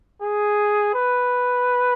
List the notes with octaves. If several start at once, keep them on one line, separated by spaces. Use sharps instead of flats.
G#4
B4